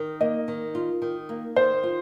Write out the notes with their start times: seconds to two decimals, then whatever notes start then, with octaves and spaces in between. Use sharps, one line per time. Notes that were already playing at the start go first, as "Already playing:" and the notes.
Already playing: D#3
0.21 A#3 D#5
0.48 D#3
0.75 F4
1.02 D#3
1.29 A#3
1.56 D#3 C5
1.83 F4